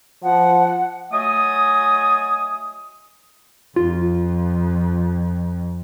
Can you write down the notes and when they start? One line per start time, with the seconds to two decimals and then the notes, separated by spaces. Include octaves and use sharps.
0.23 F3 F#5
1.12 F#3 A3 D#5 G#5 D#6
3.76 F2 F4